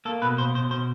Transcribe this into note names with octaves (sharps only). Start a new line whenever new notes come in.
A#3 A4
B2 B4
B2 C5
B2 C5
B2 C5